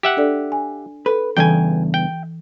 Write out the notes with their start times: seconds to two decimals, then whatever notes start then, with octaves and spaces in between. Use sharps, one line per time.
0.03 G4 E5 F#5
0.17 D4 A4 D5
0.52 G#5
1.06 A4 B4
1.37 E2 G2 C#3 E3 A4 G5 G#5 G6
1.94 G5